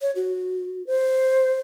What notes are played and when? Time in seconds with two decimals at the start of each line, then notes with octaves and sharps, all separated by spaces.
0.02 C#5
0.16 F#4
0.87 C5